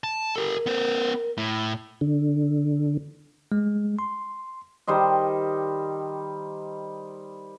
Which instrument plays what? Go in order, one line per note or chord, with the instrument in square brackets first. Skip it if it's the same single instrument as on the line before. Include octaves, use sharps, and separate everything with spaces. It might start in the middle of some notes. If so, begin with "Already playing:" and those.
[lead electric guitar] A5
[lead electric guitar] G4 A4 [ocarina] A#4
[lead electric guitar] B3 C5
A2
[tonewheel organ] D3
[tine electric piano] G#3
C6
[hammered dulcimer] D#3 G3 C5 D#5